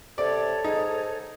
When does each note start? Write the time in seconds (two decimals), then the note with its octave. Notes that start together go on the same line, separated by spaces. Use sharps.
0.18 C3 A4 C#5 D5
0.64 G#2 D#4